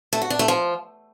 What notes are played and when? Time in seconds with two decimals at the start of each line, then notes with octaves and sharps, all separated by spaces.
0.13 A3
0.22 F#4
0.30 D4
0.39 A3
0.48 F3